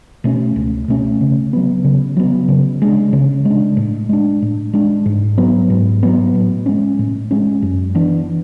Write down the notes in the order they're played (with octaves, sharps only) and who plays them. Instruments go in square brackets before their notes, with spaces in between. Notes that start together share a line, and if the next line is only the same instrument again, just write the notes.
[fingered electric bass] B2 A3 C#4
C#2
B2 A3 C#4
C#3
F#3 B3
C#3
F#3 B3
C#3
G#3 D4
C#3
G#3 D4
A2
G#3 D4
A2
G#3 D4
G#2
F#3 B3
G#2
F#3 B3
A2
G#3 C#4
A2
G#3 C#4
F#2
E3 B3 D4